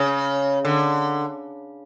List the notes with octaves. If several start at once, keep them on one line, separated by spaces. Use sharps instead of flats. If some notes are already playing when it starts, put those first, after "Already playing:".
Already playing: C#3
D3